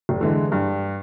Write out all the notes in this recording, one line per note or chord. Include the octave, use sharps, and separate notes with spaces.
F1
D3 E3 G#3
G2